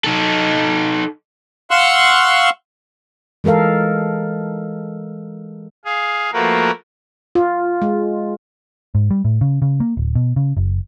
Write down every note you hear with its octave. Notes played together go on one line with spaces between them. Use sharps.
D#4 A4
F5 F#5 C6 C#6 E6 F#6
E3 G#3 A4 A#4 F5
G#4 F5
F3 A3 A#3 F#4 A#4 B4
F4
G#3
G#2
G3
A2
C#3
C#3
A#3
D1
B2
C#3
F#1